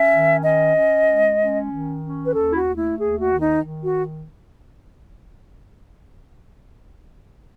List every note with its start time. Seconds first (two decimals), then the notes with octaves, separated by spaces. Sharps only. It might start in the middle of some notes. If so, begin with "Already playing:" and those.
Already playing: C#4 E5
0.12 D#3
0.43 C#4 D#5
0.75 C#4
1.07 G#3
1.40 C#4
1.71 D#3
2.02 C#4
2.25 B4
2.35 D#2 A4
2.52 E4
2.56 F#4
2.66 A3
2.77 E4
2.98 D#2 G#4
3.20 F#4
3.31 D#3
3.41 D#4
3.62 D#3
3.83 F#4